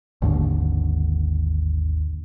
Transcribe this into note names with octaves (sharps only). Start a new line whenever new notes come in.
G#1 D#2 D3